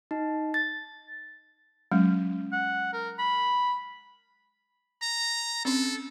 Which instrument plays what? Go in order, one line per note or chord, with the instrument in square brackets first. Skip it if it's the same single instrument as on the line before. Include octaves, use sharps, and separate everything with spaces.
[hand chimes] D#4
A6
[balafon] F#3 G#3 C#4
[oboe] F#5
A#4
B5
[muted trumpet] A#5
[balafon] C4 C#4 [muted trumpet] A4